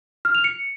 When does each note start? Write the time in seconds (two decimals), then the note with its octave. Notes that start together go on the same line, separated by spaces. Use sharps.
0.25 F6
0.35 F7
0.44 C#7